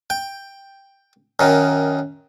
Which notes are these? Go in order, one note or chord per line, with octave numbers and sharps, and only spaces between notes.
G5
F#2 D#3